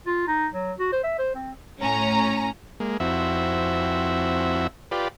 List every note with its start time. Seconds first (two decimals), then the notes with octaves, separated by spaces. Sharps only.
0.06 F4
0.28 D#4
0.53 F#3
0.78 F#4
0.92 C5
1.04 E5
1.18 C5
1.35 C4
1.80 A2 C#4 A#5
2.80 G#3 A#3
3.00 F2 C4 E4 F#4 E5
4.91 F4 G4 B4 D5